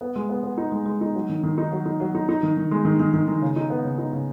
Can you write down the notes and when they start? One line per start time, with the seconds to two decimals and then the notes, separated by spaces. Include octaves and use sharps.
0.01 B3
0.16 G#3
0.29 B3
0.43 B3
0.58 D#4
0.72 G#3
0.86 G#3
1.01 D#4
1.15 F#3
1.29 D#3
1.43 D#3
1.58 D#4
1.72 F#3
1.86 D#4
2.00 F#3
2.15 D#4
2.29 D#4
2.43 D#3
2.57 D#3
2.71 G#3
2.85 D#3
3.00 D#3
3.14 D#3
3.28 D#3
3.42 C#3
3.56 D#4
3.70 B3
3.85 C#3
3.98 D#4
4.13 C#3